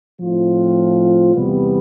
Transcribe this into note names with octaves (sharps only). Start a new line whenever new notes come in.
A2 F3 C4 F4
E2 C3 G3 B3